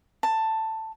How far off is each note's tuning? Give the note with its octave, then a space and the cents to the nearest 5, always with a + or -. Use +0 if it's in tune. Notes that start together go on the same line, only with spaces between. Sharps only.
A5 +10